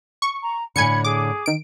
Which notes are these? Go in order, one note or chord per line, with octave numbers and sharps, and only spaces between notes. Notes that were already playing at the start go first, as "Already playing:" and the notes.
C#6
A#5
A2 D3 G#5 B5 G#6 C#7
G#4 D6
D#3 D7